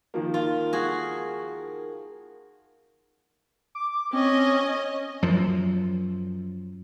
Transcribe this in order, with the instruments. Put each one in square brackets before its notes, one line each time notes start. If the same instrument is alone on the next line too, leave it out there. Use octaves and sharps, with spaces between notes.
[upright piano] D#3 F3 A#3
[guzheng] F4
F#4 G#4
[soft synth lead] D6
[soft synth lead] C4 [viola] C#4 D#5
[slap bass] F#2 F3